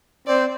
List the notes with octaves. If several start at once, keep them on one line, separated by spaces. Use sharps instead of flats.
C4 D5